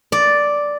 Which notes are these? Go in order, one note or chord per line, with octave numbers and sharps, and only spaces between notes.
D5